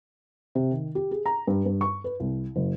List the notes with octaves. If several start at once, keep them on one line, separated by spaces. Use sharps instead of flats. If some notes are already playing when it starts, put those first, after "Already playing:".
C3
D#3
G4
G#4
A#5
G2
G2
C#6
B4
C2
F#1